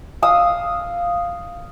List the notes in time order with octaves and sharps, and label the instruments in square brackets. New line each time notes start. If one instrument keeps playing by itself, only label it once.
[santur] F5 D#6 E6